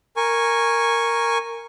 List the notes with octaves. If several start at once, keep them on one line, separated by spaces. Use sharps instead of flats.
A#4 G#5 C#6